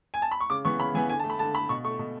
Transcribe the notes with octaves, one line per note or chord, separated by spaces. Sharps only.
G#5
A5
B5
C#6
C#3 D6
E3 B3 C#6
C#3 B5
E3 B3 G#5
D3 G#5
A5
A3
B5
D3 A5
A3 B5
B2 C#6
A3 C#6
B2